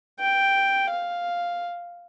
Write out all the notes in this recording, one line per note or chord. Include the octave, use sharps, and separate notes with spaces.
G5
F5